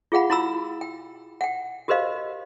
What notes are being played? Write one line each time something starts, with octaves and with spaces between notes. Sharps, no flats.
F4 G#4 F5 F#5 B5
E4 F#4 A#5 B5 E6
G5
F#5 G5
F#4 G4 A#4 C5 D#5 F5